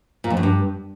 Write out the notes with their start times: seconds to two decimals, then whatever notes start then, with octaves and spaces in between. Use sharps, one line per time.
0.24 A#2
0.30 F2
0.37 F#2
0.43 G2